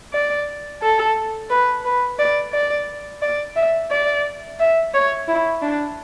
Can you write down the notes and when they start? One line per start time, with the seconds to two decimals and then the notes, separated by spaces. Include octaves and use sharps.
0.14 D5
0.82 A4
1.50 B4
1.85 B4
2.19 D5
2.53 D5
3.22 D5
3.56 E5
3.91 D5
4.60 E5
4.94 C#5
5.28 E4
5.62 D4